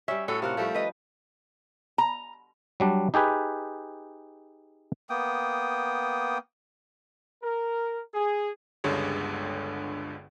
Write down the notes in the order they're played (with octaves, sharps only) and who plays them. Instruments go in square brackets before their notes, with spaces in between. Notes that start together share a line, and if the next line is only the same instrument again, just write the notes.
[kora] G3 C#4 [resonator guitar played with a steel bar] E5
[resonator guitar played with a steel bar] A2 C#5 [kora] F#4 [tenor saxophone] A4
[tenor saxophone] C3 [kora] F4 A#4 F#5
[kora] F3 G3 [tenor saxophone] A3
[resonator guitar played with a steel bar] B4 D#5
A#5
[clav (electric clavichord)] F#3 G3 D4
D#4 G4 G#4 B4
[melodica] A#3 B3 G5 D#6
[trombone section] A#4
G#4
[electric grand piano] G1 C#2 G2 D3 G#3 C#5